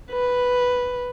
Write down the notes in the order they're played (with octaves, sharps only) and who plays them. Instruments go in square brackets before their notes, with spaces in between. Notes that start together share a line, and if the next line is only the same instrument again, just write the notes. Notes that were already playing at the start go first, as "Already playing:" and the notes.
[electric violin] B4